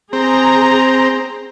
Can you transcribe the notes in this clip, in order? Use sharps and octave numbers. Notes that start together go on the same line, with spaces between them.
C4 G#4 A#5